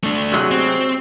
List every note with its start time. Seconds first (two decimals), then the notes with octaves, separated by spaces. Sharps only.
0.04 A3 D4
0.32 C3 F#3 G#3
0.51 C4